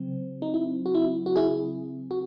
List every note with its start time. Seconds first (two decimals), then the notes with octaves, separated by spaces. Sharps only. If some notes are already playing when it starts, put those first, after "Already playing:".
Already playing: C#3 F#3 C4
0.42 D#4
0.54 E4
0.86 F#4
0.95 E4
1.26 F#4
1.36 E4 G#4
2.11 F#4